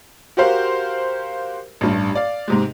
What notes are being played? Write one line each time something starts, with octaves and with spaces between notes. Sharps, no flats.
F#4 G4 A#4 C5 F5
A1 G2
D5 F5
G#2 C3 G#3